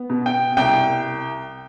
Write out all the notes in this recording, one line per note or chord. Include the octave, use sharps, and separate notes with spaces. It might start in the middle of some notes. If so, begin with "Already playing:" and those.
Already playing: B3
B2
G5
C2 G5